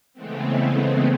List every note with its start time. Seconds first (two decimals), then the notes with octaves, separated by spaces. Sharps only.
0.13 C#3 E3 G#3 A3 B3 C4